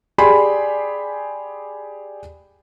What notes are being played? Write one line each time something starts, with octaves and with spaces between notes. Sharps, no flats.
G4 G#4 D5 G#5 B5 C6